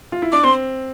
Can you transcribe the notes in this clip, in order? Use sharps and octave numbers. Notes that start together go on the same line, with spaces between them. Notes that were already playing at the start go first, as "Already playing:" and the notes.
F4
E4
D4 D6
C4 C6